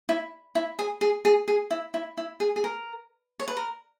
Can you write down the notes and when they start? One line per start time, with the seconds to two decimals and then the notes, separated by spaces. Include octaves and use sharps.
0.09 E4
0.55 E4
0.79 G#4
1.01 G#4
1.25 G#4
1.48 G#4
1.71 E4
1.94 E4
2.17 E4
2.40 G#4
2.56 G#4
2.64 A#4
3.40 C#5
3.48 B4
3.57 A#4